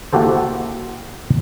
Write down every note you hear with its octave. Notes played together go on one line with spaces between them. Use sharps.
A#3 E4 F#4 G4 A4 C5